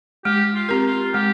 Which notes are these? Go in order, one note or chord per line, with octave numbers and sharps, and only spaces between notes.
G#3 G4
F4
C4 G4 A#4
F4
G#3 G4